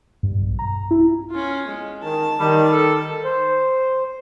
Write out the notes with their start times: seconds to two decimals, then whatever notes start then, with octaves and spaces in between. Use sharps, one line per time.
0.23 G2
0.42 B1
0.59 A#5
0.91 E4
1.31 C#4 F4
1.68 G#3
2.03 D#3 A5
2.39 D#3 G3
2.72 A4
3.24 C5